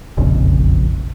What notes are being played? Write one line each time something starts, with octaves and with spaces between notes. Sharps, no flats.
E1 A#1 F2 C#3